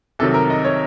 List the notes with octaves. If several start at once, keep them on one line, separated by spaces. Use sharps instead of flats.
C2 C3 D#3 F#3 A4
A#4
D#5
C#5